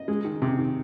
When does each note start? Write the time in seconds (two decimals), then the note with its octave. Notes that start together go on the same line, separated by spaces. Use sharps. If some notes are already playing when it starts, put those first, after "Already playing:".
Already playing: D#5
0.08 G#3
0.25 D#3
0.42 C3
0.58 D#3